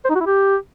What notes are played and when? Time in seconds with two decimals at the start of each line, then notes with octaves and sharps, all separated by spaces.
0.05 C5
0.10 D#4
0.16 F#4
0.21 E4
0.26 G4